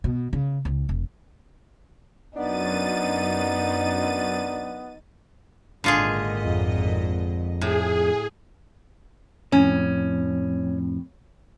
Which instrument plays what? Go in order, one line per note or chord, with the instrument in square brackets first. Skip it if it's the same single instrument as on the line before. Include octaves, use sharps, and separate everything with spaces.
[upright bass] B2
C#3
C#2
E1
[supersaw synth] F#2 A6 D#7 [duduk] B3 [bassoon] D4 [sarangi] D#4
[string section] G#1 A#2 D#5 [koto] D3 F4 G#4
[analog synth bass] F2
[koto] A2 [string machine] G#4
[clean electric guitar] F2 A2 [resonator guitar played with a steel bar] C#4